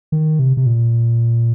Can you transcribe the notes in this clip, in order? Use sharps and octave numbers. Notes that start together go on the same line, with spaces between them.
D#3
C3
C3
A#2